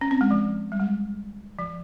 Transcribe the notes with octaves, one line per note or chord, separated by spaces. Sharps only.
C#4
C4
G#3
F3
G3
G#3
F3